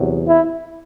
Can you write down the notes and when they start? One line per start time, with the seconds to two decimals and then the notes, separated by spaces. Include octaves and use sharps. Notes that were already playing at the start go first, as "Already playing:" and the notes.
Already playing: E2 C3 F#3
0.28 E4